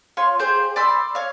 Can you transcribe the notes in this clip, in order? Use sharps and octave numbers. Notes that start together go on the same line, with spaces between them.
F4 C#5 C6
G4 G#4 C5 G6
D5 B5 C6 E6
C#5 F5